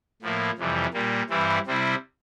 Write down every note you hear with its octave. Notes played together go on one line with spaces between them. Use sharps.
A2 F3 A#3 E4
F2 C3 E3 G3
A#2 G3 A#3
G2 E3 G3 C4 E4
C3 G3 C4 E4